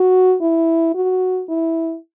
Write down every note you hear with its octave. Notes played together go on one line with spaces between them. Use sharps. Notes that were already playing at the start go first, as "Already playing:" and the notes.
Already playing: F#4
E4
F#4
E4